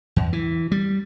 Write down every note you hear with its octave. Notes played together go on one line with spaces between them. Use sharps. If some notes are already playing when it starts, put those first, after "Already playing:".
E2
E3
G3